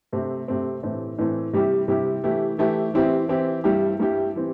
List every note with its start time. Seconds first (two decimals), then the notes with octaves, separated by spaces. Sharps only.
0.13 C3 A3 C4
0.48 C3 A3 C4
0.83 A2 E3 A3 C4
1.18 A2 E3 A3 C4
1.53 C3 G3 E4 G4
1.88 C3 G3 E4 G4
2.24 E3 A3 E4 G4
2.58 E3 A3 E4 G4
2.94 E3 C4 E4 G4
3.29 E3 C4 E4 G4
3.64 G2 G3 E4 G4
4.00 G2 G3 E4 G4
4.36 E3 C4